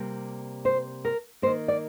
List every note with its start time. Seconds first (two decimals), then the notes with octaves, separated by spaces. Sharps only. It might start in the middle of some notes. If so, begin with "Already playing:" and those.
Already playing: C3 G3 A#3
0.65 C5
1.05 A#4
1.42 A#3 C5
1.46 D#3
1.68 D5